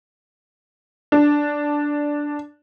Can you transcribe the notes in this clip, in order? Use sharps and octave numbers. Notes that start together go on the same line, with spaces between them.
D4